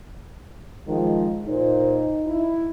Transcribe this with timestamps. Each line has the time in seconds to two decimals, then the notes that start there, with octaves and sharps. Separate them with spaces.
0.87 D#3 F3 G#3
1.47 A#2 D#4 C5
2.26 E4